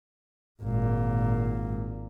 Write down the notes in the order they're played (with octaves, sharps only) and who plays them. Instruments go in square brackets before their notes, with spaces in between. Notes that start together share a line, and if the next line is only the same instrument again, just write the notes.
[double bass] G#1 A#2